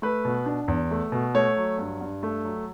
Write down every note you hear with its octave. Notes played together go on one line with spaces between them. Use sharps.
A3 B4
B2
D4
E2
A3
B2
A3 C#5
F#3
G2
G2
A3
F#3